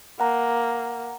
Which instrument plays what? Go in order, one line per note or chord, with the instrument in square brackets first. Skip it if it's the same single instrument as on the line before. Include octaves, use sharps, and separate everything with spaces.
[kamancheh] A#3 [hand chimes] F#5 A#5